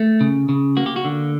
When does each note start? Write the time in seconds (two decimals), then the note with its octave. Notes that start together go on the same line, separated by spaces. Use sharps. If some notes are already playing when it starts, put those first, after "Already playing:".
Already playing: A3
0.21 C#3
0.49 C#3
0.77 A#3 F#4
0.86 G4
0.96 F#4
1.05 D3